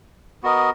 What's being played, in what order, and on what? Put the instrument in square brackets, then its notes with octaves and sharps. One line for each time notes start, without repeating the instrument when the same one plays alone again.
[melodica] B3 F#4 A#4 D#5